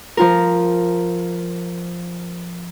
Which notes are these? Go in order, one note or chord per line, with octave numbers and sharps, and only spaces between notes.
F3 F4 A#4